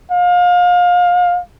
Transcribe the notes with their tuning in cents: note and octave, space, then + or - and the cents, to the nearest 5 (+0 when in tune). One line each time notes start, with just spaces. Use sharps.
F5 +30